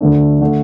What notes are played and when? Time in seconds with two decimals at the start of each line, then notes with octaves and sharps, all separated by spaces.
0.01 D2 D3 A3 D4
0.41 D3 A3